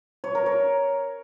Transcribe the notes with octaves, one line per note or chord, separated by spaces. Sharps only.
C#5
A#4
C#5